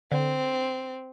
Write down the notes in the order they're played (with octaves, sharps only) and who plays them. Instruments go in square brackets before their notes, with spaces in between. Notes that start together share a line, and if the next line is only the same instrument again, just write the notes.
[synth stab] D3 [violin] C4